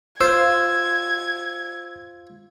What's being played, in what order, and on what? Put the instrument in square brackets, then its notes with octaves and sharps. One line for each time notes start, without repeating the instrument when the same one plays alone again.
[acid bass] F4 [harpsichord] C5 [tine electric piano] E6 [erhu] G#6